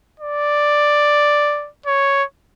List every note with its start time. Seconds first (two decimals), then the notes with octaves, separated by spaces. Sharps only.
0.20 D5
1.86 C#5